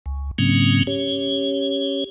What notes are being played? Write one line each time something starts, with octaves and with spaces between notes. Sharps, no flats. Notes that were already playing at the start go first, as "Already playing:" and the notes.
C#2
G#2 C#3 F#3 A#3 C4 C#4
C#4 G4 C#5